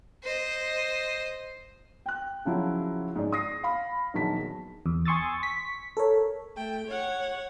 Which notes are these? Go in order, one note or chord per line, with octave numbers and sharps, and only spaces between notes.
C5 D#5
G5 F#6
C#3 F3 F#3 E4
G#2 D5
D#6 A#6 C7
F5 B5
A#1 E2 D#3 F#3 A5 B6
E2
G#5 C6 C#6 D#6 E6 A6
C#6 B6
A4 A#4 C#5
A3 G5
C#5 F#5